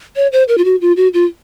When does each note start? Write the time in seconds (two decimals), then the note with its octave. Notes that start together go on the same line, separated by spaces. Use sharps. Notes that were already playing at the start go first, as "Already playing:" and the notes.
0.16 C#5
0.32 C5
0.48 A#4
0.58 F4
0.65 F#4
0.81 F4
0.97 F#4
1.14 F4